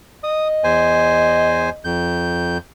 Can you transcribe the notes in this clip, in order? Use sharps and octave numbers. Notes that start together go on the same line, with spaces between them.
D#5 D#6
E2 C5 G#5
F2 G6